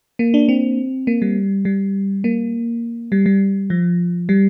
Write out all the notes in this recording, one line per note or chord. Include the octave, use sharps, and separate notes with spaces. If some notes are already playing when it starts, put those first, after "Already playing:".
A#3
D4
C4
A#3
G3
G3
A#3
G3
G3
F3
G3